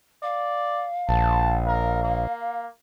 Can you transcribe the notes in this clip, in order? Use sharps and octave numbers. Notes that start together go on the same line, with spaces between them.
D5 F5
A#1 A5
A#4
A#3